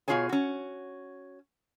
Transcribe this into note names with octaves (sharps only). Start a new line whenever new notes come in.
B2 F#3 F4 G#4 C#5 G#5
C#4 F#4